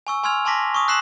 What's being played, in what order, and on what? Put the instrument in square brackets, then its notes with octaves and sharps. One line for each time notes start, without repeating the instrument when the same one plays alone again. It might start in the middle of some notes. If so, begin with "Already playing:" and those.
[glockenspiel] G#5 C#6 E6
G#5 C6 E6 F6 G#6 F7
G#5 A5 C6 D6 A#6 B6
C#6 D#6
E6 F#6 B6 C7 E7 F#7